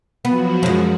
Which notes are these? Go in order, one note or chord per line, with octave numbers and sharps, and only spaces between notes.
F3 F#3 B3 F#4
F#2 G#3